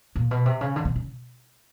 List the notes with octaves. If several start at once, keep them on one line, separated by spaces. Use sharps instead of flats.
A#2
B2
C3
C#3
D3
C3
C#3